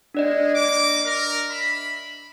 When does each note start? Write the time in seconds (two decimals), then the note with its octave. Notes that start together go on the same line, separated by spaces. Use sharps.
0.14 G#3 D4 D5 D#5
0.54 A#3 D6
1.05 A#4
1.50 E5 B5